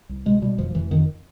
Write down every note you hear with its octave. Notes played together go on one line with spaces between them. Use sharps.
C2
B2 G#3
B2 G3
F1 F3
F1 E3
F2 D#3